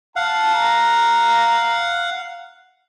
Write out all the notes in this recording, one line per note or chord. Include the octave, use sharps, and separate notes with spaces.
F5 F#5 A5
A#5